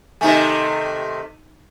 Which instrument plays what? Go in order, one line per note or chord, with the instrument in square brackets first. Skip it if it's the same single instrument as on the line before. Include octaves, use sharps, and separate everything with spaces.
[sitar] C3 D#3 A3 [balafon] D#4 E5 G#5